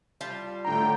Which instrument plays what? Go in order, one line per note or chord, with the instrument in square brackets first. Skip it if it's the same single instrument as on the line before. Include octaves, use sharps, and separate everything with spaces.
[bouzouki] G3 F4 A5
[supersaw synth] A2 D3 G5 [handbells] A#5